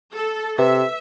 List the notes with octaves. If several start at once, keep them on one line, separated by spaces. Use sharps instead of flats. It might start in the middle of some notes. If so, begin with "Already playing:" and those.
A4
C3 B4 E5